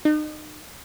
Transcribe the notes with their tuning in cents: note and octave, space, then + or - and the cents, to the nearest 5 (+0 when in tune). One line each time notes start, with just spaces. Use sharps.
D#4 -35